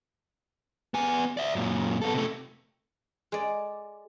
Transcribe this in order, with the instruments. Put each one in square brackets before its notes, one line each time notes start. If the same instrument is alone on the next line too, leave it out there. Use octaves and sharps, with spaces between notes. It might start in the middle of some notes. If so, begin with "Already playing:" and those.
[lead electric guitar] B3 G#5
D5 E5
F#2 A#2
B3 A4
C3 A3
[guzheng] G#3 D5